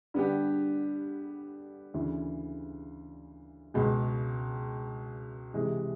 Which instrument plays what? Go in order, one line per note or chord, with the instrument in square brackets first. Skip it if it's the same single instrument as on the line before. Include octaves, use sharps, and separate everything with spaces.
[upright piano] D3 G3 B3 D4 G4
D2 C#3 E3
C#2 B2 G#3
C3 E3 G#3